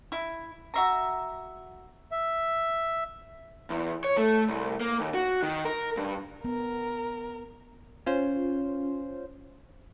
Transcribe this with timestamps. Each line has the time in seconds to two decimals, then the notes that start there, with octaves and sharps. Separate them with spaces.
0.12 E4
0.74 F#4 E5 A#5
2.11 E5
3.70 E2
4.04 C#5
4.17 A3
4.49 C2
4.81 A#3
5.00 D#2
5.14 F#4
5.43 D#3
5.65 A#4
5.97 G2
6.45 B3 A#4
8.06 C#4 F4 C5